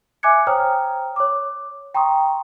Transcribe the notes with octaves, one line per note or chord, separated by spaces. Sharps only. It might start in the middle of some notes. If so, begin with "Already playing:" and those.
E5 G#5 D6 F#6 G#6 C#7
C5 C#5 G5 A#5 D#6 F6
C#5 D6
G5 A#5 C6 C#6 D#6